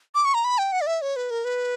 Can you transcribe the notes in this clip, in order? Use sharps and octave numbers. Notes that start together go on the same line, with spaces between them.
D6
C#6
A#5
B5
G5
F#5
D5
E5
C#5
B4
A#4
B4